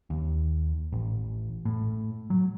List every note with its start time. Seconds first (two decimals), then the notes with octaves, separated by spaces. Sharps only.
0.10 D#2
0.92 A1
1.65 A2
2.30 F#3